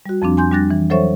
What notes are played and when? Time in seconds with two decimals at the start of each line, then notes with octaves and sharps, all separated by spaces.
0.06 G3 F#4
0.22 F2 F3 C4 D4
0.37 G#5 C6 G6
0.52 G3 D4 F#6 A6 A#6
0.71 E3
0.90 F#3 A4 C5 C#5 E5 C#6